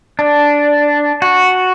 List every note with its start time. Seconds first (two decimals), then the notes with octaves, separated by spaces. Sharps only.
0.19 D4
1.22 F#4